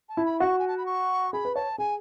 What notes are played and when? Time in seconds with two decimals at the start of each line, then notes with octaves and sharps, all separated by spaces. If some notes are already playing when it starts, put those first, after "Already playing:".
0.09 A5
0.17 E4
0.25 B5
0.40 F#4 C#6
0.59 G#5
0.68 A5
0.78 B5
0.86 C#6
1.33 G#4 B5
1.45 B4
1.55 C#5 A5
1.78 G#4 G#5